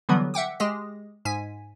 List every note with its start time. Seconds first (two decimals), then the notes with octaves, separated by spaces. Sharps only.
0.09 D3 E3 F#3 G3 B3
0.34 E5 F#5 G5 D6
0.60 G#3 G4 G#4 D#5 A#6
1.25 G#2 G#5 B6